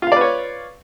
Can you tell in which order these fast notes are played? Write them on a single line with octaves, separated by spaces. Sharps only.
F4 F5 D5 B4 C#5